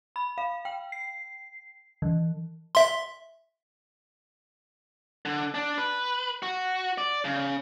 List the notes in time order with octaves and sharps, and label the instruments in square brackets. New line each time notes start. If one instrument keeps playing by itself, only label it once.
[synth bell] B5
F5
G5
C7
E3
[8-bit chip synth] E5 C6
[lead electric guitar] D3
D4
B4
F#4
D5
C#3